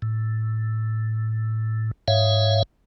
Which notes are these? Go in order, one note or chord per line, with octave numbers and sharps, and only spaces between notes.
A2
G#2 C#5 E5 F5